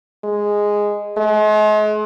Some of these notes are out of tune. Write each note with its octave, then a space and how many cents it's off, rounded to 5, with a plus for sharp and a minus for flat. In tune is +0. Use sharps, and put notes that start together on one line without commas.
G#3 -5
G#3 +40